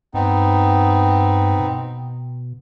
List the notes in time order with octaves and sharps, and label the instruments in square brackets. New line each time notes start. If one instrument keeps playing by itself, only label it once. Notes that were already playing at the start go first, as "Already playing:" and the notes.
[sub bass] G2 [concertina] B3 C4 D#4
[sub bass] B2